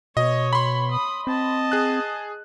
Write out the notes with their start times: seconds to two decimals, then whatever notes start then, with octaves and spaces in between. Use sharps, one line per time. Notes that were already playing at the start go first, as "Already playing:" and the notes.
0.17 B2 C#5 D#5
0.53 B5 C6
0.91 D#6
1.27 C4 D#5 A5
1.72 G#4 F#6